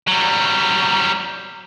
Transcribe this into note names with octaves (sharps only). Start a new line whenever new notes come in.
F#3 G3